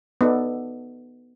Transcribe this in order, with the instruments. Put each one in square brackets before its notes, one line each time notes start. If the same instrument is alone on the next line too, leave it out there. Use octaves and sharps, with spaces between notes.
[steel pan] B3 D#4 A4 D5